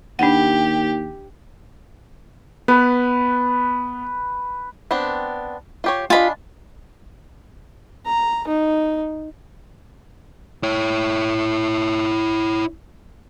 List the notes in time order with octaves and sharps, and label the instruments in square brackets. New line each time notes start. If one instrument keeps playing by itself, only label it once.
[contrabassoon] D#2 [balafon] D4 F#5 [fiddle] G4
[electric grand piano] B3 [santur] B4
[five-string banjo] B3 C4 D4
F4 G4 C#5
[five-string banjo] D4 D#5 G#5 [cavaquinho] F4 B5
[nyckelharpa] A#5
D#4
[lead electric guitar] E4 C#5